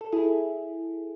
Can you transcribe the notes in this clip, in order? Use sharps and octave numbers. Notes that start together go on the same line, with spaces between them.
A4
E4 G#4